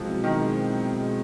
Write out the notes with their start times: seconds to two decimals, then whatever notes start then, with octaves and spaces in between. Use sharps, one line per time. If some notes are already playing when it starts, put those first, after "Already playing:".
Already playing: B2 F3 F#3 G#3 C4
0.08 E4
0.23 B2 D#3
0.40 G#3
0.54 C4
0.70 E4
0.85 B2
1.01 G#3